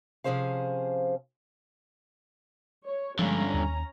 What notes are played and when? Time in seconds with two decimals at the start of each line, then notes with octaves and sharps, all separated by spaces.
0.24 C3 F3 C#4 G#4 C5 F5
2.86 C#5
3.19 G2 D3 F3 G#3 C#4 A#5
3.54 D#2